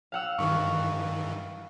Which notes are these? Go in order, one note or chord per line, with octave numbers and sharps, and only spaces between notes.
F5 F#5 E6
G2 D#3 E3 C#6